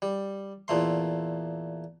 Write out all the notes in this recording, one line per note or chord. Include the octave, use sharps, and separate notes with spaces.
G3
E2 A#2 A3 C6